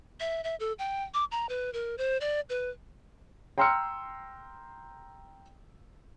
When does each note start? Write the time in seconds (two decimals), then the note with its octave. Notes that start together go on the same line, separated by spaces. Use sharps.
0.20 E5
0.44 E5
0.60 A4
0.79 G5
1.14 D6
1.31 A#5
1.49 B4
1.73 A#4
1.98 C5
2.21 D5
2.50 B4
3.58 G5 A#5 C6 E6 F6 C#7